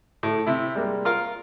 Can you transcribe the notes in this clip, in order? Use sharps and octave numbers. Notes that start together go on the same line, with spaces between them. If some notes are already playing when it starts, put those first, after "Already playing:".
A2
C3 E4
G3 G#3 A#3
F4 A#4 F5